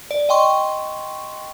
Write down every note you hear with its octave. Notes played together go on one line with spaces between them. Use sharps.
D5
D#5 G5 C6 C#6